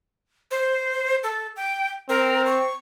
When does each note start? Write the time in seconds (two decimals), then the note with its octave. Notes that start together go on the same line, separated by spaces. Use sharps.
0.51 C5
1.23 A4
1.56 G5
2.09 C4 A#4
2.46 C#6